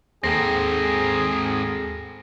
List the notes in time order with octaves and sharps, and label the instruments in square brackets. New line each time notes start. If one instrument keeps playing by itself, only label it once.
[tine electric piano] D#2 A4 G5 [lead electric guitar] G#2 C4 [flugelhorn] G#4 [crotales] A#6